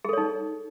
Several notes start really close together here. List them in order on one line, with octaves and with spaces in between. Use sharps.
G#4 A4 C#5 D#4